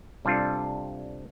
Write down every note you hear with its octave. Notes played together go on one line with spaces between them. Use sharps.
C3 G3 D4 F4 A4